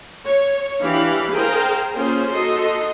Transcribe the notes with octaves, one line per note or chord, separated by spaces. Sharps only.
C#5
E3 D4 G4 F5 B5
G#4 A#4 C5 F5 G5 A#5
A#3 C#4 F4 G#4 C5
D#4 F#4 A4 D#5 C6